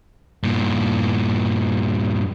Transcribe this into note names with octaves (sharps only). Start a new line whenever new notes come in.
G2 A#2